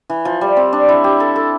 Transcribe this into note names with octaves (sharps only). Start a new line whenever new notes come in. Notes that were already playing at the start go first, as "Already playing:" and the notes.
E3
F3
G3
C4
D4
E4
G4
A4
A4